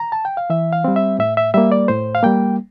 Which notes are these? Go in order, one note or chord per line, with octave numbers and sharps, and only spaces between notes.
A#5
A5
G5
F5
E3 E5
F5
G3 C4
E5
A2 E5
E5
G3 A#3 E5
D5
A2 C5
F5
G3 A#3 G5